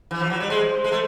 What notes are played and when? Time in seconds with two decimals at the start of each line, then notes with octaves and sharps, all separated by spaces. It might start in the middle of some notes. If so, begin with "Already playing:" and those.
0.11 E3
0.20 F3
0.30 F#3
0.40 G3
0.50 G#3 C5
0.84 G#3
0.92 A3